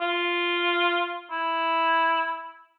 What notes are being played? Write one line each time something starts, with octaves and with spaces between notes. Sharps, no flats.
F4
E4